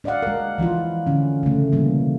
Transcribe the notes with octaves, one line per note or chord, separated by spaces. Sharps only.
D4 D5 D#5 F5 F#5
G#3 A#4
E3 F3 E4 F4
D3 C#4
C#3 A3
B2 E3 G3 A#3 B3